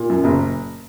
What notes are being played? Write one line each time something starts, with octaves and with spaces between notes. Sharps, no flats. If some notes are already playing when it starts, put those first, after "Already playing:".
Already playing: A#2
F#2
F#1